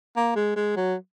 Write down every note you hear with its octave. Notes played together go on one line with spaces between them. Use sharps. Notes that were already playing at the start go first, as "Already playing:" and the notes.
A#3
G#3
G#3
F#3